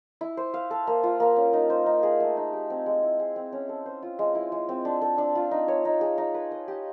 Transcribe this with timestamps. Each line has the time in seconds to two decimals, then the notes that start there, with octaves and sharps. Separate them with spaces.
0.21 E4
0.37 C5
0.54 F5
0.71 A4
0.87 A#3
1.03 F4
1.20 A#3
1.36 C#4
1.53 D#4
1.70 C5
1.86 D#4
2.03 G#4
2.20 A3
2.37 D#4
2.53 G4
2.70 C4
2.86 G#3
3.03 E4
3.19 G#4
3.36 C4
3.52 C#4
3.69 A4
3.86 C5
4.03 F4
4.19 G#3
4.35 E4
4.52 G#3
4.69 C4
4.85 D4
5.01 A4
5.18 D4
5.35 F4
5.51 D#4
5.68 C#5
5.85 D#4
6.01 G#4
6.18 D#4
6.34 B4
6.51 D#5
6.68 G4